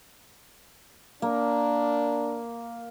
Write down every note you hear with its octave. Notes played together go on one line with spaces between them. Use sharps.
A#3 D4